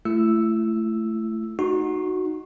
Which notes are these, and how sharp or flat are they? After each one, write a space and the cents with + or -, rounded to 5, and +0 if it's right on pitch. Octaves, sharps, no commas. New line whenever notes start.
A3 +0 E4 +35 E6 +0
D#4 +0 F#4 +0 C#6 -45